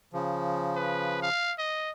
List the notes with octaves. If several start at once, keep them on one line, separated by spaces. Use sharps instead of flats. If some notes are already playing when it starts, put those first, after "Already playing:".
C#3 F3
B4
F5
D#5